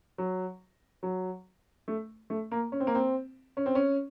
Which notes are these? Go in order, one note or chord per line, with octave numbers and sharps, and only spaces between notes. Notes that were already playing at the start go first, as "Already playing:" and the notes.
F#3
F#3
A3
A3
A#3
C#4
C4
A#3
C4
C#4
C4
C#4